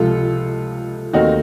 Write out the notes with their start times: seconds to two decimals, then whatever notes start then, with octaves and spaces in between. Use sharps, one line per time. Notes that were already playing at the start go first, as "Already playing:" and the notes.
Already playing: C#2 C3 F3 F4 A4
1.13 D#2 D#3 A3 C4 D#4 F#4